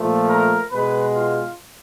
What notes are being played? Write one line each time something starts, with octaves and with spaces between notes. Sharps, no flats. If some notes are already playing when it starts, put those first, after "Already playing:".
Already playing: A#2 F3 A3
A#4
B2 G#3 B4
F4